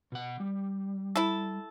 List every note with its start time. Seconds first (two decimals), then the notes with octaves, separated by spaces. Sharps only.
0.12 B2 F#5
0.40 G3
1.16 E4 A4